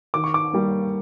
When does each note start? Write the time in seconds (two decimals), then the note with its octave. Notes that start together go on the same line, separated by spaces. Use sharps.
0.14 D#3 D6
0.24 C#6
0.34 D6
0.53 G3 A#3